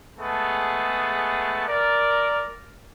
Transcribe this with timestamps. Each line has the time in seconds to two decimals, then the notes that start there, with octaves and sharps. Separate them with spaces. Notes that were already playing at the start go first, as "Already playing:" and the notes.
0.19 G#3 A3 B3 G#4 A5
1.67 A#4 D5